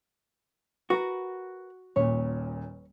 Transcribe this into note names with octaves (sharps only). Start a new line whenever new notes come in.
F#4 A#4 B4
D#1 A#2 B4 C#5